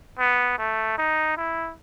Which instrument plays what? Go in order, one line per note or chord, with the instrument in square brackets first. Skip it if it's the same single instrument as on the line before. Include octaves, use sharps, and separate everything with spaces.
[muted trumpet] B3
A3
D#4
E4